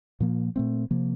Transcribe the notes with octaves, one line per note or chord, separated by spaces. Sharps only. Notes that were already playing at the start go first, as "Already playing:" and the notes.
A#2 F3 A#3
A#2 A3 C4
C3 F3 A#3